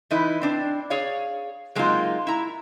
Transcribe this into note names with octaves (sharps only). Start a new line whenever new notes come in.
E3 D#4 E4 B4
C4 D4
G#4 C#5 D5 F5
F#3 G#3 A#3 C4 D#4 F4
E4 A#5